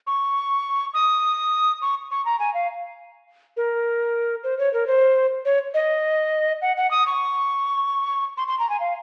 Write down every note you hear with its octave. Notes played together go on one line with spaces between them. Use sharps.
C#6
D#6
C#6
C#6
A#5
G#5
F5
A#4
C5
C#5
A#4
C5
C#5
D#5
F#5
F#5
D#6
C#6
C6
C6
A#5
G#5
F5